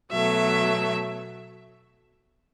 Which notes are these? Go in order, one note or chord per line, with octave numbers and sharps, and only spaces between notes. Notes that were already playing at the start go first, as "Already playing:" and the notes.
B2 F#3 A3 E5